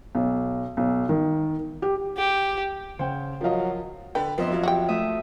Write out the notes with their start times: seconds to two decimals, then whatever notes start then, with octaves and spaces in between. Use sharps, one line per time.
0.15 B1
0.77 B1
1.09 D#3
1.82 G4
2.17 G4
2.99 C#3 C5 F#5 G5
3.41 F3 F#3 A#4 D#5 F5
4.15 D3 A4 B4 G5
4.38 F2 B3 D#5 E5 C6
4.50 F3 F#3 F4
4.63 F#4 G4 G5
4.88 A3 E5 D#6